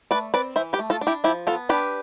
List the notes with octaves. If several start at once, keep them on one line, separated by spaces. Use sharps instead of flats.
A3 B4 D5
C4 B4 D5
E3 C5 E5
G4 B4
A3
F4 A4
D4
E4 G4
F3 E4 G4
B3 F4 A4
D4 G4 B4